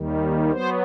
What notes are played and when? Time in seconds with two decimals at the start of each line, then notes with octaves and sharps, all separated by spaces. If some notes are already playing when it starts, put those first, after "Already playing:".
Already playing: D#2 D#3 G3
0.51 F#3 B3 C5